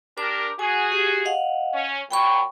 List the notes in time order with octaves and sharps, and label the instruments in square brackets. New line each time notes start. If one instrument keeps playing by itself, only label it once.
[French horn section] D4 G4 A#4 [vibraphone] D6
[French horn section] F#4 G#4 [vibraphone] G#5
[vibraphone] G4
D#5 F5 F#5
[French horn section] C#4
[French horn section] A#2 F#3 [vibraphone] G5 B5 C#6